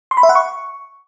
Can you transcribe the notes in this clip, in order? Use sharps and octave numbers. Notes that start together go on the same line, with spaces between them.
C6
B5
E5
F#5
C#6